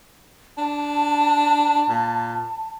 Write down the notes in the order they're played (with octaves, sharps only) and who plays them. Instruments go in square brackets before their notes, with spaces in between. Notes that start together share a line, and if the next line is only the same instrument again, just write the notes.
[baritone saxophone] D4 [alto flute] A5
[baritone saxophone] A#2